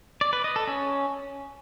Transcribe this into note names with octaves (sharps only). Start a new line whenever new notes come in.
D5
B4
D#5
A4
C#4